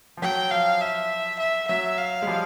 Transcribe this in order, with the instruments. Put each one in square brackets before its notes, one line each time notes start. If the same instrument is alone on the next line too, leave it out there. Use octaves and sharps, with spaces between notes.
[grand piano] F3
[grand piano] F#3 [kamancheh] G5
[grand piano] F3 [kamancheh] F5
[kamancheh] E5
E5
[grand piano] F#3 [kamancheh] E5
[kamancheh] F5
[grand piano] G#3
F3 G3